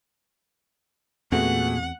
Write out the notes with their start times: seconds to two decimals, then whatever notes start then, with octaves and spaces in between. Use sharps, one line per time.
1.32 E2 A#2 A3 B3 C4 F#4 G#4 F#5